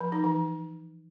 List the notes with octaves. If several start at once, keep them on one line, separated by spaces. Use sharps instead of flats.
F3
D#4
E3